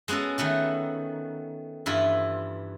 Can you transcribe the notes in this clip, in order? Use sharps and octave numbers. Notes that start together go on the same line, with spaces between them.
G#3 B3 C#4 F#4 A4
D#3 A3 B3 F#4
G2 E3 E4 F4